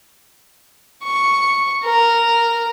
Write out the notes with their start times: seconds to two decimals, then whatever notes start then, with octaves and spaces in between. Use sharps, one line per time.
1.04 C#6
1.84 A#4